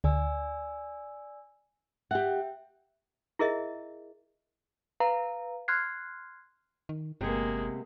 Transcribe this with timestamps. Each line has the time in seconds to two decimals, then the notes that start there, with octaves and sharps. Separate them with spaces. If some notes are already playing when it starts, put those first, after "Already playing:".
0.04 D2 D5 G#5 E6
2.11 G4 E5 F#5 G5
3.39 E4 G#4 A#4 D#5 E5
5.00 B4 F5 A#5
5.68 C6 F6 F#6 G#6 C7
6.89 D#3
7.21 G1 C3 G#3 A#3 B3